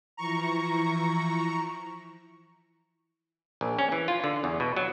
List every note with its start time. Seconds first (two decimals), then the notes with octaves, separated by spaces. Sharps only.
0.17 E3 F3 E4 A#5 C#6
3.61 A#1
3.79 C#4
3.92 E3
4.08 F4
4.24 D3
4.44 E2
4.60 B2
4.76 F#3